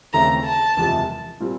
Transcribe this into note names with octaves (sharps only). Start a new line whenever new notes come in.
D#2 C#3 E3 A3 C4 A#5
A5
F#1 E2 C3 F3 G#3
A#2 G3 C4